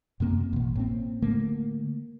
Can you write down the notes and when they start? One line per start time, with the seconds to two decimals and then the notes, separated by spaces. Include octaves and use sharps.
0.20 F#2 C3 A#3 C4
0.53 A1 B2
0.75 A2 A#3 C4
1.22 D3 A3 A#3